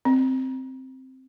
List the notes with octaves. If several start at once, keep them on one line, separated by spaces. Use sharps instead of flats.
C4